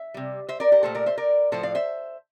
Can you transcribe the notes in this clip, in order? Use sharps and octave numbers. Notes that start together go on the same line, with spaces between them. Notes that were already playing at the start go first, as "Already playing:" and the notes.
Already playing: E5
C3 G3
C5 E5
A#4 D5
G4 A#4
A#2 A3 A4 C5
A#4 D5
C5 E5
A#4 D5
A2 F3 A3 A4 C5
D5 F5
C5 E5